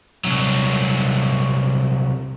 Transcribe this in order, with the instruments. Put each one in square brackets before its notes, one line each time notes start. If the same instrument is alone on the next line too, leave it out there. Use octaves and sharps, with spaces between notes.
[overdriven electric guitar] C2 F#3